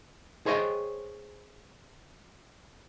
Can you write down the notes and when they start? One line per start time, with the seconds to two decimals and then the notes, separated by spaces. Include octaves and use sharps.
0.46 G#4 C5 C#5 D#5 E5 G5